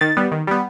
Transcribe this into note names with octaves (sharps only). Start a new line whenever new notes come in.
D#3 A6
G3 B3
D#3
G3 B3